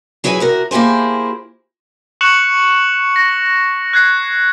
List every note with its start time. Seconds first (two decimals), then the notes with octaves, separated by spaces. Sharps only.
0.24 F#3 E4 G#4 B4 G5 G#5
0.40 C3 F#4 A#4
0.71 A#3 E4 G4 G#4 C5
2.21 C#6 F#6 C#7 E7 F#7
3.16 A#6
3.93 F#6 G#6 C7